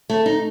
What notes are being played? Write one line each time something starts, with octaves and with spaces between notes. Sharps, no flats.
A3
D#4